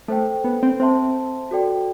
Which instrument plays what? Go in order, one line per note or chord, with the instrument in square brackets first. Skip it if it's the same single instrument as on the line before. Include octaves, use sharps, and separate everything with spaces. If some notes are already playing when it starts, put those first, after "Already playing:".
[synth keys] A3 [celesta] A4 C5 G5
[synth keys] B3
C4
[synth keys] C4 [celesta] C5 E5 A5 C6
[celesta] F#4 A4 D5 G5